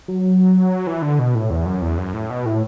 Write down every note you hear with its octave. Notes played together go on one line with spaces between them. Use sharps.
F#3
E3
D3
B2
A2
E2
F#2
E2
F#2
A2
B2
A2